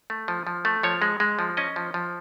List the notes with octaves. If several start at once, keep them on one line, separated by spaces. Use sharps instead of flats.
A3
F3
F3
A3
F3 C#5
G#3
G#3
F3
C#4 D#5
F3
F3